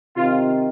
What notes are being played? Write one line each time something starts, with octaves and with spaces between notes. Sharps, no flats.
C3 D#3 F4